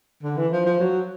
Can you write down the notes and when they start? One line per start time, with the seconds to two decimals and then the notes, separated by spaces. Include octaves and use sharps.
0.23 D3
0.37 E3
0.52 F3
0.66 F3
0.80 F#3